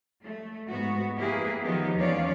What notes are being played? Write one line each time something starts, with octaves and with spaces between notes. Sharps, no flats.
A3
G#2 B3 F#4
A#3 E4 G4 G#4 B4
D#3 F3 F#3 B3 D#4 G4
E2 F3 C#4 C#5 D5 F5